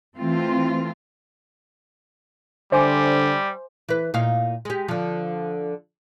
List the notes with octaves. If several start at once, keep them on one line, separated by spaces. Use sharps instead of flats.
E3 A3 C4 F4
D3 G3 C5 E5 G#5 D6
E3 B4
A#2 D#4 F5
G#3 G4
D3 F3